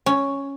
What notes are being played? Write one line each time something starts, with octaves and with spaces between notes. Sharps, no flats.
C#4